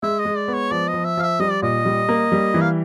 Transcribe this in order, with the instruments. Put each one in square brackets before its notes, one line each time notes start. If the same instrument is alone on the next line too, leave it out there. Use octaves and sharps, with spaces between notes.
[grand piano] G#3 [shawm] E5
[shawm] D#5
[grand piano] G#3
[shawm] D5
[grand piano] B3
[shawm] C#5
[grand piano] F3 [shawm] D5
[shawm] D#5
[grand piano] F3
[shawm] E5
[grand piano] F3 [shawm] F5
[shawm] E5
[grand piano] G3 [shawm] D#5
[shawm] D5
[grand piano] A#2 [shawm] D#5
[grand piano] G3
A#3
G3
E3
[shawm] F5